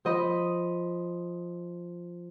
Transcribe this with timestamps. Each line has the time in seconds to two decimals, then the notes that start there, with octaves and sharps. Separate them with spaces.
0.05 F3 D#5 B5